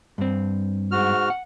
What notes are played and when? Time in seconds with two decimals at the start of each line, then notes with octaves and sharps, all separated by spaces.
0.18 G2 C4
0.91 G#2 F#4 F6
1.30 F#5